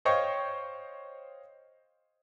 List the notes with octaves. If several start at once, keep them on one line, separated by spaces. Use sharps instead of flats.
C5 C#5 D#5 F5 G5 C#6